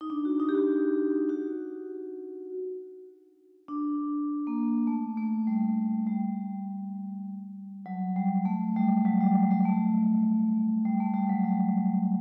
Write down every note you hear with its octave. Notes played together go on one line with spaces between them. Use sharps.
D#4
D4
F#4
D#4
G4
F#4
F#4
D4
A#3
A3
A3
G3
G3
F#3
G3
A3
G3
F#3
G3
G3
G3
A3
G3
A3
G3
F#3
G3